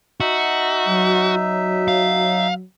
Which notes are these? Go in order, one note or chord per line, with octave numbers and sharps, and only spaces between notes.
D#4 F#4 E5
F#3
F5